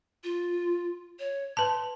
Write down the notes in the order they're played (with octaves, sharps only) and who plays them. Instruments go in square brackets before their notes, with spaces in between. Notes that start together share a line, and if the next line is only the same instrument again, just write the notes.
[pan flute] F4
C#5
[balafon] B4 A5 [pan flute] C6